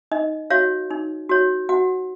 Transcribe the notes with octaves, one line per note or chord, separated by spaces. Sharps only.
D#4 D#5
F#4 C#5 F5
D#4
F#4 C#5
F#4 F#5